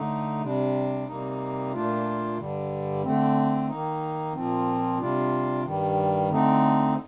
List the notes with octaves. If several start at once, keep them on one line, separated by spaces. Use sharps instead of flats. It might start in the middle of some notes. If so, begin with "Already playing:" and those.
Already playing: D3 A3 D#4
C3 G3 D4
C3 G3 A#3 D#4
A#2 A3 D4 F4
G2 D3 G3
D3 A3 C4
D#3 A#3 D#4
A#2 F3 C4
C3 G3 D4 F4
G2 D#3 G3
D3 A3 C4 D#4